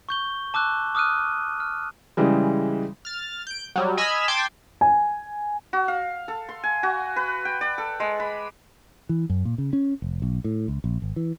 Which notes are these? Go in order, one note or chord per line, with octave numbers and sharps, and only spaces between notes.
C#6 G6 G7
A5 D6 E6 F#6
D6 D#6 F6 F#6 D#7
F6
C#3 E3 G3 G#3
F6 A6
G6 D7
F#3 G3
D#5 G#5 B5 E6 F6
G5 A5 C6 D6 G#6
G#5
F#4
F5
A4
C6
G#5
F#4
B4
G5
D5
A4
G#3
B5
E3
F#2
A#2
C#3
C#4
F1
B1
A2
C#2
A#1
G#1
E3